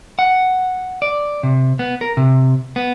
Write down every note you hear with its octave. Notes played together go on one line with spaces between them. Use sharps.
F#5
D5
C3
B3
A#4
C3
B3